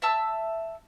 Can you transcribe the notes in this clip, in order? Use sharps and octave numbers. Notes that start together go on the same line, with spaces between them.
E5 A5 E6